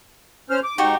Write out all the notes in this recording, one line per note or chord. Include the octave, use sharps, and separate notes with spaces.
C#4 C5 F6
D6
G#2 D#4 F#4 G4 C#6